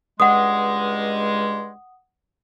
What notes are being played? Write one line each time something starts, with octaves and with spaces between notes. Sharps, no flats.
C#2 G2 G#3 F#5 D#6